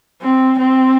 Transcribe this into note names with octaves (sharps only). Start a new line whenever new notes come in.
C4
C4